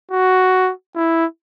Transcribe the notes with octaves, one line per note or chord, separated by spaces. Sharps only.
F#4
E4